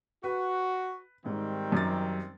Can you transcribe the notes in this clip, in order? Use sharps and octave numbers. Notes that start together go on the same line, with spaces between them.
F#4 B4
G#2 D#3 G3 C4
F#2 G4 A6